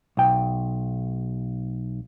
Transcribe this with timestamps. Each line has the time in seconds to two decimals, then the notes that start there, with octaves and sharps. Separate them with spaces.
0.17 B1 G5